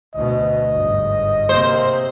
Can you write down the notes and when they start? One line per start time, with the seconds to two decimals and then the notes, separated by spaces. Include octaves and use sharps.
0.16 D2 B2 D#5
0.72 G1 G#2
1.49 C3 A#3 C5